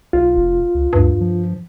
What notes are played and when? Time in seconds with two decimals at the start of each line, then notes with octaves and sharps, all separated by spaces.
0.13 B1 F4
0.36 F1
0.74 C#2
0.93 D2 G2
1.21 F3